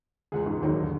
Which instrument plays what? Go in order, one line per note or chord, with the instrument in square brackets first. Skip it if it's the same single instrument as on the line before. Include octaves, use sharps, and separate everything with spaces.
[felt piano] E1 C#2 G#3 [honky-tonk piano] G#4 F#5
[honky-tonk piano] G#2
[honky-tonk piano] A#1 D#3 F#3 [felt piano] D#2
[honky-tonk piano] D3